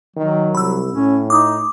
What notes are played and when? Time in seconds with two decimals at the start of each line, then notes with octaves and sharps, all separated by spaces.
0.16 D#3 F#3
0.55 C2 B5 E6
0.93 A2 C#4
1.30 D#4 D6 D#6